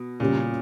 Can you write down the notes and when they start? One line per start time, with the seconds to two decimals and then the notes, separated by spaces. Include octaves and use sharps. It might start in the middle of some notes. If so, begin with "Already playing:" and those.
Already playing: B2
0.20 A#2 C#3 G3 C#4 G4